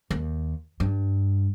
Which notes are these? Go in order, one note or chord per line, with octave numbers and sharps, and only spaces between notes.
D#2
G2